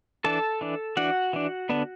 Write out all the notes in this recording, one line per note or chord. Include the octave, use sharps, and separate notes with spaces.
E3 D4 A4 A5
E3 D4
E3 D4 F#4 F#5
E3 D4
D3 B3 D4